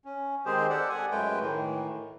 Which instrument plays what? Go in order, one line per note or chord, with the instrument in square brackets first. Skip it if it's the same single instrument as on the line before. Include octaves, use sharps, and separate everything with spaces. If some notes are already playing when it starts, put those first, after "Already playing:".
[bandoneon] C#4
D#3 G#3 C4 G4 G#4 C5
G4 A4 D5 F#5
F#5 G#5
F#2 G#3 A3 B4 G5
A2 D#3 E3